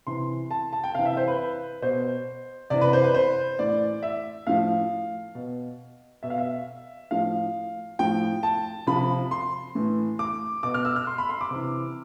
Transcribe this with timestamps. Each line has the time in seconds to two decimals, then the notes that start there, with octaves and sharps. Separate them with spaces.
0.07 C3 E3 C6
0.51 A5
0.73 A5
0.84 G5
0.95 C3 E3 F5
1.05 E5
1.17 C5
1.28 B4
1.82 B2 C5
2.70 C3 E3 D5
2.81 B4
2.93 C5
3.04 B4
3.14 C5
3.59 A2 E3 D5
4.03 E5
4.47 A2 F3 F5
5.35 B2
6.23 B2 E5
6.30 F5
6.38 E5
7.11 A2 F3 F5
7.99 A2 F3 G5
8.43 A5
8.87 C3 F3 B5
9.31 C6
9.75 A2 E3
10.19 D6
10.63 B2 D6
10.74 F6
10.85 E6
10.96 F6
11.07 C6
11.18 B5
11.29 C6
11.41 D6
11.51 C3
11.56 E3